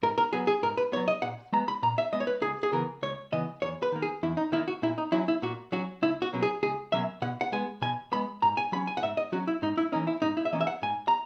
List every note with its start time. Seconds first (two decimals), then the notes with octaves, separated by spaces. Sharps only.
0.03 G#2 A#4
0.18 A#4
0.33 F#3 B3 G#4
0.47 G#4
0.63 G#2 A#4
0.77 B4
0.92 B3 C#5
0.96 F#3
1.08 D#5
1.22 A#2 F#5
1.53 G#3 B3 A#5
1.68 B5
1.83 A#2 A#5
1.98 E5
2.13 G#3 B3 D#5
2.20 C#5
2.27 B4
2.42 C#2 G#4
2.63 G#4
2.72 C#3 E3 B3 A#4
3.03 C#2 C#5
3.32 C#3 E3 B3 D#5
3.62 E2 C#5
3.83 B4
3.92 D#3 A#3
4.02 G#4
4.23 E2 E4
4.37 D#4
4.52 D#3 A#3 E4
4.68 F#4
4.82 A#2 E4
4.98 D#4
5.12 F#3 C#4 E4
5.28 E4
5.42 A#2 F#4
5.72 F#3 C#4 F#4
6.02 C#2 E4
6.22 F#4
6.33 B2 F#3 A#3 C#4
6.43 G#4
6.63 C#2 G#4
6.92 B2 F#3 A#3 C#4 E5
7.22 B2 F#5
7.41 F#5
7.52 G#3 B3 G#5
7.82 B2 G#5
8.12 G#3 B3 B5
8.42 G#2 A#5
8.57 G#5
8.72 F#3 C#4 B5
8.87 G#5
8.97 F#5
9.03 G#2 E5
9.17 D#5
9.32 F#3 C#4 F#4
9.47 E4
9.62 G#2 D#4
9.78 E4
9.92 E3 A#3 C#4 D#4
10.07 E4
10.22 G#2 D#4
10.37 E4
10.45 E5
10.52 E3 A#3 C#4 D#5
10.61 E5
10.67 F#5
10.82 G#2 G#5
11.08 A#5